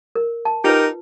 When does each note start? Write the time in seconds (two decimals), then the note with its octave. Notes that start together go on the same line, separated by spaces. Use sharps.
0.15 A#4
0.45 A5
0.64 D#4 F4 G4 A#4 B4